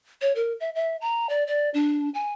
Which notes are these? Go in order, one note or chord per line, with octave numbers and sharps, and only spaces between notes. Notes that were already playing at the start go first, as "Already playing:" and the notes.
C#5
A#4
E5
E5
A#5
D5
D5
D4
G#5